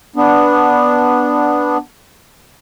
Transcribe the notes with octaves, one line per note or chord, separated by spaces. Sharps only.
B3 D4